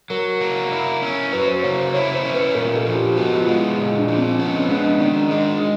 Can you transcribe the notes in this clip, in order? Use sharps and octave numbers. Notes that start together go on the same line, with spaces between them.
F#3 A#4
A#3
E4
C#4
F#3 B4
C5
A#3 C#5
C5
E4 C#5
C5
C#4
B4
A#2 A#4
A4
F3
G4
B3 F#4
F4
G#3
E4
A#2
D4
F3
C4
B3 C#4
C#4
G#3 C#4
D4
D#3 D4
G#3